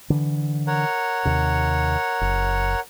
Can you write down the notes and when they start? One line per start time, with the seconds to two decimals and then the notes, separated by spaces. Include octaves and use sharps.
0.10 D3 E3
0.67 A#4 C#5 F#5
1.25 D#2 C3
2.21 F#1